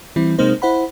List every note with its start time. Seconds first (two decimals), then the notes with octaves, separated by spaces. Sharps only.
0.16 E3 G3 C4 E4
0.39 C3 G#3 A#3 C4 D#4 C5
0.62 E4 C5 F#5 B5